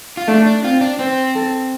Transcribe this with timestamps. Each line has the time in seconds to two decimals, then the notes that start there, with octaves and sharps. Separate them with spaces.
0.17 F4
0.27 A3 D4
0.46 D4
0.64 C4 F4
0.81 D4
0.99 C4 C5
1.35 A4